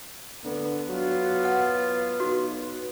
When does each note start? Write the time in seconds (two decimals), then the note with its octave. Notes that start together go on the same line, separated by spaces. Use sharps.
0.45 D3 B3
0.89 F#3 F4
1.45 F#5
2.20 B1 F#4